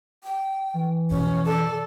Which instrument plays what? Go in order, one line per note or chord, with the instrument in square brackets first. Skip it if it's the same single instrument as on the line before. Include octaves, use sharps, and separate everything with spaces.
[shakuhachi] G5
[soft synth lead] E3
[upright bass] F2 B2 [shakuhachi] C#4
[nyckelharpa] A4 [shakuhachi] D5